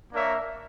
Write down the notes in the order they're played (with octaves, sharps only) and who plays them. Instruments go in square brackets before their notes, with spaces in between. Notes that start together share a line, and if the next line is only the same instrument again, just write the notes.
[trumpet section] A#3 D4 A#4 C#5 E5